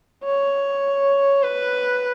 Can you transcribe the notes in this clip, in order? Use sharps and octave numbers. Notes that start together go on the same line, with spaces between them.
C#5
B4